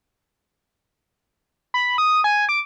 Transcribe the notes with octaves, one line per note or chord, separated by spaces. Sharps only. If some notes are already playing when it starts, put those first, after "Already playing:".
B5
D#6
G#5
D6